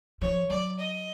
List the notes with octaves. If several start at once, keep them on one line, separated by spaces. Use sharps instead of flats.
F3 C#5
F#3 D5
D#5